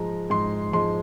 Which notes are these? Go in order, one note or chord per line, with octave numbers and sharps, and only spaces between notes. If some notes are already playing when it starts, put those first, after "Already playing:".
Already playing: G#2 F3 G#3 A#5
G#2 C6
F3 G#3 C6